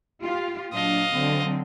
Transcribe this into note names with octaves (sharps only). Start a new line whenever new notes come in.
F4 G4
A#2 F#3 D4 D#5 F5
D3 F#3 C4